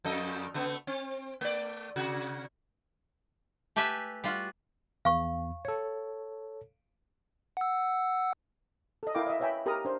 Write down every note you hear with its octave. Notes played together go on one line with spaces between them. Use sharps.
F2 A4 D#5
C#3 A3 B3
C4
A3 D5
C3 F#4
A3 G4 B4 E5 G#5
G3 F4 F#4
E2 F5 C#6
A4 C#5
F#5 E6
A4 D#5
E4 A#4 F5 G5 D6
D#5 E5
B4 C#5 E5 G5 G#5 B5
G4 A#4 D#5 A5 A#5 D#6
D4 C5